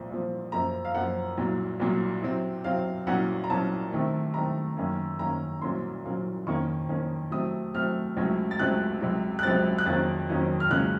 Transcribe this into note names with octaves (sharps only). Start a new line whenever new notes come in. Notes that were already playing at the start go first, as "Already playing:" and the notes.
Already playing: C2 A#2 F3
C2 A#2 F3
F#2 F3 A#3 A#5
F5
F#2 F3 A#3 F#5
C2 A#2 F#3
C2 A#2 F#3
C3 F#3 C4
C3 F#3 C4 F5
C2 A#2 F#3 A#3 C#4 F#5
A#5
C2 A#2 F#3 A#3 C#4 A5
C3 D#3 A3
C3 D#3 A3 A#5
F#2 D#3 A#3 C#4
F#2 D#3 A#3 C#4 A#5
C2 A#2 F#3 A#3 C#4 C6
C2 A#2 F#3 A#3 C#4
F2 D#3 A#3 C#4 C#6
F2 D#3 A#3 C#4
C3 F#3 A3 C4 D#6
C3 F#3 A3 C4 F6
C#2 C3 F#3 A3 C#4
A6
C#2 C3 F#3 A3 C#4 F#6
C#2 C3 F#3 C4
F#6
C#2 C3 F#3 C4 A6
F#6
F2 D#3 F#3 A#3 C#4 A6
F2 D#3 F#3 A#3 C#4
F6
C#2 C#3 F#3 A#3 C#4 F#6